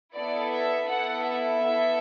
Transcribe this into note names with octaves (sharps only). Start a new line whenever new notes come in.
B3 E4 A4 D5
E5
B3 E4 A4 F#5
E5
B3 E4 A4